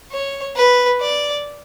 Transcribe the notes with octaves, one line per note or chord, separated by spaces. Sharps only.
C#5
B4
D5